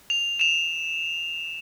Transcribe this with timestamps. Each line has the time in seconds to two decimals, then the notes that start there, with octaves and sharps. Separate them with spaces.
0.10 F7
0.40 E7 F7